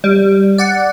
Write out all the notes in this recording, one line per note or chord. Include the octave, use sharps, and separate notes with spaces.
G3
D5 F#5